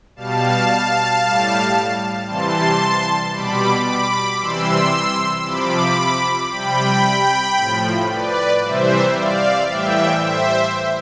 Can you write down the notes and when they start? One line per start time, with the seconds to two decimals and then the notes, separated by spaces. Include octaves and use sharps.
0.16 B2 G3 F5 A5
1.22 A2 G3
2.27 C3 E3 G3 A5 C6
3.33 B2 G3 B5 D6
3.86 B5 D6
4.39 C3 E3 G3 C6 E6
5.46 C3 F3 B5 D6
6.51 C3 G3 G5 B5
7.57 A2 F3
8.11 B4 D5
8.63 C3 E3 G3 C5 E5
9.16 D5 F5
9.69 A2 E3 G3 E5 G5
10.22 C5 E5